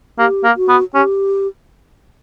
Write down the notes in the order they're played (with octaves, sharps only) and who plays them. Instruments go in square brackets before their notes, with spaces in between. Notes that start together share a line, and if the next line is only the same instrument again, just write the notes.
[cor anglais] A#3 [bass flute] G4
[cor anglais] A#3
[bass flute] F#4
[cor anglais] B3
[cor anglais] C#4 [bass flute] G4